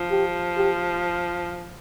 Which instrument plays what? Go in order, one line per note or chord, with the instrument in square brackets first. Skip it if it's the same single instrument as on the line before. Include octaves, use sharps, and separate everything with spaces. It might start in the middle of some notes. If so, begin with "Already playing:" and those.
Already playing: [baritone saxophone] F3
[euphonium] G4
G4